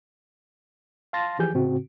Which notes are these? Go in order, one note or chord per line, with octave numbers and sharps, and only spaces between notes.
F5 A5 C6 A6 A#6
E3 F3 G4 G#4 G#5 G6
A2 C#3 C4 F#4